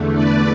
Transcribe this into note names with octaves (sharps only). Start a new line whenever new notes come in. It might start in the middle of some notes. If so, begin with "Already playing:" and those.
Already playing: E2 D3 A3
B4 D5